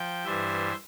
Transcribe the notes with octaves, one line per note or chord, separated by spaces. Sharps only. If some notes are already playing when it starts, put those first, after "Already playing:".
Already playing: F3 G5
G2 E3 G3 C5 E5